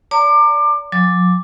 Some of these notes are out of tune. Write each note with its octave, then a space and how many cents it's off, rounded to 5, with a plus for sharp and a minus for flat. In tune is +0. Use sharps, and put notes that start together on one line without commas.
D5 -35 A#5 -30 D6 +25
F#3 -45 D6 +0